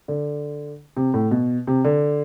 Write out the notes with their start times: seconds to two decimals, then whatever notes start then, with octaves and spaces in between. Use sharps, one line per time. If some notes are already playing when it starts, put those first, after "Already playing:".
0.08 D3
0.97 C3
1.14 A2
1.31 B2
1.67 C3
1.85 D3